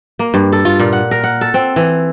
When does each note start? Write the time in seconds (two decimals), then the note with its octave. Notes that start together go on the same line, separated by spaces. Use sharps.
0.19 A#3
0.34 G2
0.53 A4
0.65 F4
0.80 A#2
0.93 F#5
1.11 A#4
1.24 F#5
1.41 A4
1.54 C4
1.76 E3